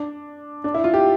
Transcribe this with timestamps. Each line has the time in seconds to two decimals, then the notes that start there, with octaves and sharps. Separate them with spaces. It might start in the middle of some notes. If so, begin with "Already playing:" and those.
Already playing: D4
0.64 D4
0.74 E4
0.84 F4
0.94 G4